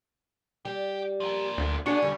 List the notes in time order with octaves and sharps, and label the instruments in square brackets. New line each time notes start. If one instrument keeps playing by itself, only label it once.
[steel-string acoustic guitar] G3 [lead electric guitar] G4
[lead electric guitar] F3 A#3
[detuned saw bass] D2
[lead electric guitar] C#4 [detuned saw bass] D4 [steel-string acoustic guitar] F#4 G#4 D5 [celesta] C#6 C#7
[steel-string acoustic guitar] E2 D3 [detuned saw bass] G3